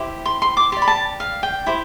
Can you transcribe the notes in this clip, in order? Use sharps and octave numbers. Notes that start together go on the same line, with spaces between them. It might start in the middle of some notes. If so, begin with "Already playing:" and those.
Already playing: E4 G4 C5
C6
C6
D6
G4 D5 C6
B5
A5
F5
G5
E4 G4 C5